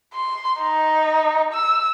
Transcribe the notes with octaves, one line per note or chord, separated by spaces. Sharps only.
C6
D#4
E6